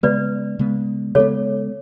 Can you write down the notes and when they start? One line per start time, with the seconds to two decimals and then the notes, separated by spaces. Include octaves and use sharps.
0.03 C#3 G#3 B3 B4 D5
0.59 C#3 G#3 B3
1.15 C#3 G#3 B3 A4 C#5